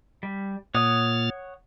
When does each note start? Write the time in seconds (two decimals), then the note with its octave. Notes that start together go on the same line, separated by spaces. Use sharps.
0.23 G3
0.74 A#2 C#5 F#5 D#6 F6 A6